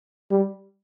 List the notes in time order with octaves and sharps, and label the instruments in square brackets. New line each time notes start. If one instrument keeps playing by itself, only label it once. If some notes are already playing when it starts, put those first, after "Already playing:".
[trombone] G3